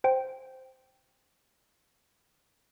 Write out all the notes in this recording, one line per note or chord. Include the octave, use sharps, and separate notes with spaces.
C5 G5